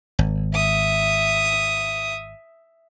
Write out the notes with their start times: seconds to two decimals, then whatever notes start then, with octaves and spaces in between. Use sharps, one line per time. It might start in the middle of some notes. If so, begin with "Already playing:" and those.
0.19 G#1
0.54 E5 D#6